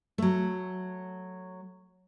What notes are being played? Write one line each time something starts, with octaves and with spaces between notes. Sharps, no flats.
F#3 A3